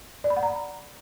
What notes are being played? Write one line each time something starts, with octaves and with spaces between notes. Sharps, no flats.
D5
B5
F#5
A#5